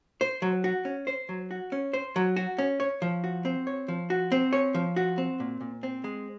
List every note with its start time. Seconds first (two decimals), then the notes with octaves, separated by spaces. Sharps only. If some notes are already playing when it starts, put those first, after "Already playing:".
0.21 C5
0.42 F#3
0.64 F#4
0.85 C#4
1.07 C5
1.29 F#3
1.51 F#4
1.72 C#4
1.93 C5
2.16 F#3
2.36 F#4
2.58 C#4
2.80 C#5
3.02 F3
3.24 F#4
3.45 C4
3.67 C#5
3.88 F3
4.10 F#4
4.32 C4
4.53 C#5
4.75 F3
4.96 F#4
5.18 C4
5.40 A#2
5.61 A#2
5.83 C4
6.04 G#3